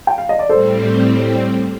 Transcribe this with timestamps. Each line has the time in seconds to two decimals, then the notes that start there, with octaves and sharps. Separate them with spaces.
0.07 G5
0.18 F5
0.29 D#5
0.39 D5
0.49 A2 G3 C4 A4 C5